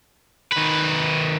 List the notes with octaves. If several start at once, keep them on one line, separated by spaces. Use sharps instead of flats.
D#3 B4